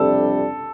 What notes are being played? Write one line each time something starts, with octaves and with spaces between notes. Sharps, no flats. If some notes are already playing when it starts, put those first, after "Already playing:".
Already playing: F2 C3 G3 D4 A4